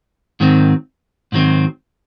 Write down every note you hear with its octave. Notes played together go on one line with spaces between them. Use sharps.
G#2 D#3 F#3 C4
G#2 D#3 F#3 C4